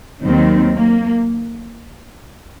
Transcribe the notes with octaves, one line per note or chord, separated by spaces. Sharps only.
D#2 D#3 F#3 C4
A#3